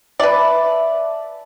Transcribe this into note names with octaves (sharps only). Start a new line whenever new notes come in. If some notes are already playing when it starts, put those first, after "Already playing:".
B4 D5 E5 A5